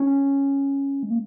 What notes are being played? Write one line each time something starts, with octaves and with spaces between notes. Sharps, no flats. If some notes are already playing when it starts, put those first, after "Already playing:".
Already playing: C#4
G#3
A#3